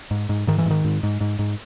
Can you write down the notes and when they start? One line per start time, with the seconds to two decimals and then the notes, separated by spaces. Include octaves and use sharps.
0.11 G#2
0.29 G#2
0.47 G#2 D#3
0.58 E3
0.66 G#2 D#3
0.84 G#2
1.03 G#2
1.21 G#2
1.39 G#2